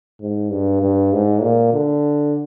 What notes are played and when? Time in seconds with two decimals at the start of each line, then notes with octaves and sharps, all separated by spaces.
0.21 G#2
0.51 G2
0.82 G2
1.13 G#2
1.42 A#2
1.73 D3